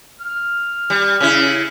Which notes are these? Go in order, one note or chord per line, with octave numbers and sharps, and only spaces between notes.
F6
G3
C#3 E4